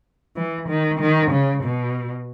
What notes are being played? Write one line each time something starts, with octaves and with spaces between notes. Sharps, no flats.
E3
D#3
D#3
C#3
B2